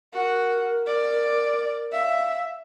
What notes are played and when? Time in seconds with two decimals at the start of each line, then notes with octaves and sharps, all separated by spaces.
0.14 F#4 A#4
0.86 D5
1.92 E5 F5